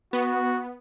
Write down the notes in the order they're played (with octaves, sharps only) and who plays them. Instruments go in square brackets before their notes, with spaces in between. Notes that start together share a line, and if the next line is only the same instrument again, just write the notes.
[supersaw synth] B3 [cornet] F#4